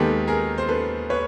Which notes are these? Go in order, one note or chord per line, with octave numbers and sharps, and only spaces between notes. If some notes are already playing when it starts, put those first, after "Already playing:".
Already playing: D#2 D#3 G#3 B3 G4 A4
G#4 A#4
C5
A4 B4
B4 C#5